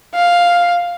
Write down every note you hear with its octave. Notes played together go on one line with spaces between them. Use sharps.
F5